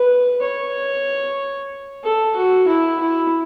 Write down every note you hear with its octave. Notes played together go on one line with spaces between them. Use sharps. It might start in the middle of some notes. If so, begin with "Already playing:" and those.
Already playing: B4
C#5
A4
F#4
E4
E4